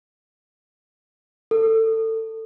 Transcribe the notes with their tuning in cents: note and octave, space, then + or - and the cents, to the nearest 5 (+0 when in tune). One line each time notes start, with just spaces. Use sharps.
A4 +25